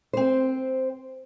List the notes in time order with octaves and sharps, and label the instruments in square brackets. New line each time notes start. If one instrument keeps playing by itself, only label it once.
[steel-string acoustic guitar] C4 C5